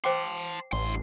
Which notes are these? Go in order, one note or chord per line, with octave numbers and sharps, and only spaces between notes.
C5 G5 A5 C6 D6
A1 G2 C6